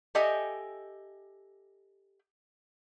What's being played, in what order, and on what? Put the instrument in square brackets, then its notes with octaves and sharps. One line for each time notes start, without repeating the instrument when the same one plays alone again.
[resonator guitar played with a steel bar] G4 A4 D#5 E5 G5 G#5